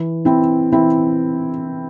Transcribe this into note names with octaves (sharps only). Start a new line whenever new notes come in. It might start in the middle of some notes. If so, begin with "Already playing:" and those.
Already playing: E3
E3 C4 E4
E3 C4 E4